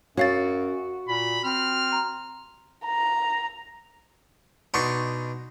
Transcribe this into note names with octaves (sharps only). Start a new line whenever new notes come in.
F#2 F#4 C#5 F5 A6
A#2 B5
C4 F6
A#5 C6
A#5
B2 D4 D#4 C6 C#6